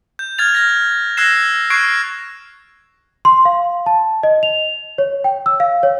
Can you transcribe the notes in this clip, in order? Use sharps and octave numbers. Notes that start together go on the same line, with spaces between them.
G6
F6 G#6 A6 F7
F6 G#6 A#6
E6 F#6 G#6 A#6 C7 E7
C#6 F#6 G#6 C7 D7
C6
F5
A5
D#5
F7
C#5
G5
E6
F5
C#5